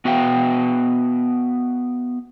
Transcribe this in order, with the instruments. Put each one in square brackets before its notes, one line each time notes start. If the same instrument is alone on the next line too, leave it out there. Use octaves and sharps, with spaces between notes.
[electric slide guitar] B3 F#4 B4 E5 F5 G5